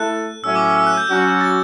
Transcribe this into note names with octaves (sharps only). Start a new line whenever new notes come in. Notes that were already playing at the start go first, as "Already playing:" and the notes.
Already playing: A3 E4 A4 F#6
A2 F#3 A3 C#4 E6
D6
E6
E6
F#6
G6
F#3 C#4 F#4
A6